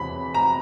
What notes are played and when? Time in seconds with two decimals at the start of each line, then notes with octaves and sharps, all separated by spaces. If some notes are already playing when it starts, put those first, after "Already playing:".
Already playing: E2 C3 E3 C#4 B5
0.34 A#5